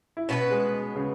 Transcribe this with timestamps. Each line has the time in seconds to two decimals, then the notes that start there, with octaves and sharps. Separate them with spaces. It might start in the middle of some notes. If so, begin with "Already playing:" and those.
0.17 E4
0.29 B2 B3 C#4 F#4 B4
0.51 G#3
0.96 C#3